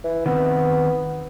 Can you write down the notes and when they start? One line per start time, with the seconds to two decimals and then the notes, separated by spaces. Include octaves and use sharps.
0.04 E3
0.26 D#3 B3 C4